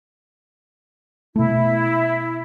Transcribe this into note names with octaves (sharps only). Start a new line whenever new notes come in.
B2 A3 E4